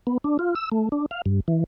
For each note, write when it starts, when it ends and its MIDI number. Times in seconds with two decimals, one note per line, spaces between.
0.07 0.18 59
0.24 0.37 62
0.39 0.55 65
0.55 0.69 88
0.72 0.89 57
0.92 1.06 62
1.11 1.22 77
1.26 1.40 43
1.48 1.64 52